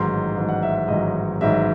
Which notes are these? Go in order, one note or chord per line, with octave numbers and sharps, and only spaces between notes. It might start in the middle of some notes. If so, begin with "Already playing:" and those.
Already playing: A1 G#2 D#3 F#3 C6
A1 G#2 D#3 F#3
F#5
E5
E5
A1 G#2 D#3 F#3 D#5
A1 G#2 D#3 F#3 E5